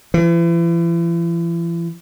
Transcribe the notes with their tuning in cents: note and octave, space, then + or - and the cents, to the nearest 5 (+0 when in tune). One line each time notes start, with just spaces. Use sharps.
E3 +40